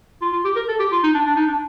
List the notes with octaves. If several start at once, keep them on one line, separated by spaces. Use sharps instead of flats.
F4
F4
G4
A#4
A4
G4
F4
D#4
D4
D4
D#4
D4